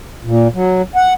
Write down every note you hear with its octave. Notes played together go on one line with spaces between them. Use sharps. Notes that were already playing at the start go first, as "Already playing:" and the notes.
A#2
F#3
F#5